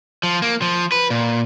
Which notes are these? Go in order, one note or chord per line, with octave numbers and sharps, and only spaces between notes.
F3
A#3
F3
B4
A#2